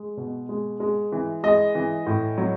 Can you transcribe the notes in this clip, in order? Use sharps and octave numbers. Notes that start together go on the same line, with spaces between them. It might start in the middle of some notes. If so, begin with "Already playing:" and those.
Already playing: G#3
B2
G#3
G#3
E3
G#3 D#5
E3
A2
F#3